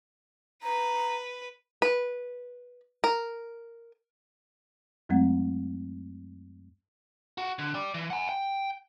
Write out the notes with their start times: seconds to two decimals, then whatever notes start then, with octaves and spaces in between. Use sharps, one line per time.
0.63 B4 A#5
1.82 B4
3.04 A#4
5.09 F#2 F#3 G#3 A3 C4 F#5
7.38 F#4
7.59 D3
7.74 G4 D5
7.94 E3
8.10 F#5 G#5
8.29 G5